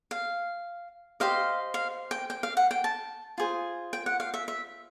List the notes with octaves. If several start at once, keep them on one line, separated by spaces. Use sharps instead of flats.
F5
G4 C5 D#5 F5
F5
G5
G5
F5
F#5
G5
A5
F4 G#4 C5
G5
F#5
F5
E5
E5